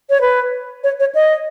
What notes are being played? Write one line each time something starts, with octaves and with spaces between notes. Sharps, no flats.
C#5
B4
C#5
C#5
D#5